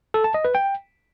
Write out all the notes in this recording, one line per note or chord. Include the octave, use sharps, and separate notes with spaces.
A4
A5
D#5
B4
G5